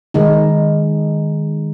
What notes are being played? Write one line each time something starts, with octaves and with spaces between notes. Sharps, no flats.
D#3 G#3 D#4